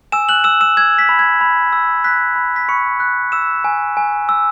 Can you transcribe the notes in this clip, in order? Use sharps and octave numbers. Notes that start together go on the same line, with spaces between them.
G#5 E6 E7
F#6 F#7
E6 E7
E6 E7
E6 G#6
B6
B5
G#6
B5
E6
F#6 B6
B5
B6
B5 C#6 C#7
F#6
E6 E7
G#5
G#5
E6